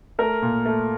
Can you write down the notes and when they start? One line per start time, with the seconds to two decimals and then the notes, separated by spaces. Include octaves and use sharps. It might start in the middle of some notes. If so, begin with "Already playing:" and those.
0.19 A3 A#4
0.42 A#2
0.66 A3